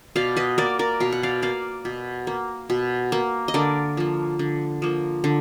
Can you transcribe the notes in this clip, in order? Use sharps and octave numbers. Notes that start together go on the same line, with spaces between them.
B2 D5 F5
B4 D#5
A#3 A#4 D5
A#4 D5
B2 F5
F#5
D5 F5
A#3 D5 F5
B2
A#3
B2
A#3
D#5
D3 A#4 D5
F3 A#3
D3
F3 A#3
D3